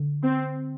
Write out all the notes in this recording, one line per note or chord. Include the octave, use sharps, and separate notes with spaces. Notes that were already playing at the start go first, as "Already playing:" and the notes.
Already playing: D3
C4